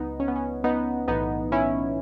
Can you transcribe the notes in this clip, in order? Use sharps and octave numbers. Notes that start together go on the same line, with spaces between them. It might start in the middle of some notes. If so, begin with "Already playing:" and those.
Already playing: C#2 F#3 B3 D#4
C#4
B3
C#4
B3 D#4
B1 A2 E3 B3 D#4
C#4 E4